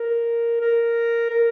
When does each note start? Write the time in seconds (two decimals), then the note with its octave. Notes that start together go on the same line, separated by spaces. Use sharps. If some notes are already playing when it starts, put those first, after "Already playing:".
Already playing: A#4
0.61 A#4
1.30 A#4